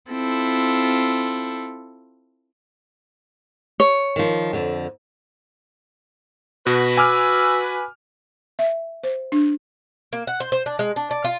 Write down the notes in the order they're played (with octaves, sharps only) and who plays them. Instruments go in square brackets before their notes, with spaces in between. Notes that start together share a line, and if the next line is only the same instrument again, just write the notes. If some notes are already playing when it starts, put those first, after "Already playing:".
[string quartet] C4 E4 F4 A4
[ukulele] C#5
[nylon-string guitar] D#3 F3
F2 D3
[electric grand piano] B2 [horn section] F#4 B4
[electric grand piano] G#5 D6 F6 [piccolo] E6
[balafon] E5
C5
D4
[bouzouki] A#3
F#5
C5
C5
D4
G#3
D4
D5
F4